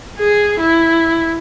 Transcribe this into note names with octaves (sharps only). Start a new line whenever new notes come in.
G#4
E4